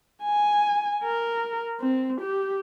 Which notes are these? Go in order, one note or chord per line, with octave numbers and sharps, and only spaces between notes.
G#5
A#4
C4
G4